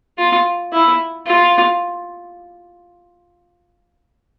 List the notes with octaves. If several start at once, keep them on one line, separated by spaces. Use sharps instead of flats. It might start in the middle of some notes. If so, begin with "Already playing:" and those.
F4
E4
F4